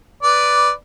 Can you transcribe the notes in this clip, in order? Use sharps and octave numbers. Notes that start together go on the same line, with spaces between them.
B4 D5